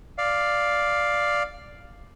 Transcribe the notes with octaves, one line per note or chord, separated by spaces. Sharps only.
D5 F5